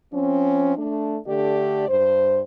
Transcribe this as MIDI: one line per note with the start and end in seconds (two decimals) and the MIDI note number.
0.14 0.75 53
0.14 0.75 60
0.14 0.75 61
0.77 1.18 57
0.77 1.18 62
1.27 1.88 50
1.27 1.88 57
1.27 1.88 62
1.27 1.88 67
1.27 1.88 74
1.89 2.41 43
1.89 2.41 72